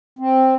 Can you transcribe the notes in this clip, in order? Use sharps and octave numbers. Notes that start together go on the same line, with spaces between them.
C4